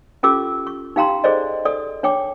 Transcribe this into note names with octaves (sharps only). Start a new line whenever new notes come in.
C#4 F4 G4 A4 D6 E6
C#6
D#4 G4 F5 G5 A#5 C6
G#4 A4 C5 D5 D#5
A4 D5 D#6
D4 C#5 G5 D6